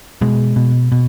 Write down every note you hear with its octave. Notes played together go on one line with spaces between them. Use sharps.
B2 G#3
B2
B2